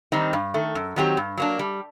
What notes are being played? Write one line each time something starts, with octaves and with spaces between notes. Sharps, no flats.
D#3 G3 C4 D#4
G2
D#3 A3
F#2
D#3 F#3 C4 G4
G2
F#3 A#3 D4
G3